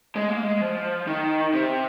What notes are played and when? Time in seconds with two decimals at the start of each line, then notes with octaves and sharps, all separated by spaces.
0.16 G#3
0.29 A#3
0.43 G#3
0.61 F3
1.07 D#3
1.53 C3